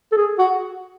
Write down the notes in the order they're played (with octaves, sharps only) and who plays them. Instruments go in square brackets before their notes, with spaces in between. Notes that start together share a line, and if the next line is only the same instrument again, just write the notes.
[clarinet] A4
G#4
[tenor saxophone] F#4